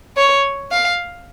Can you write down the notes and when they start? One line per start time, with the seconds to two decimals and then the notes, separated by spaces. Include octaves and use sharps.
0.17 C#5
0.72 F5